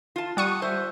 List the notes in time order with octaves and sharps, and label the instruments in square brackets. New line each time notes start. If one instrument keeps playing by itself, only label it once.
[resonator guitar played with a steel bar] F4 A5
[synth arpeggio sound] G3 C#6 D#6 [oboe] F#5
[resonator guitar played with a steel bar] C5 [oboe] E5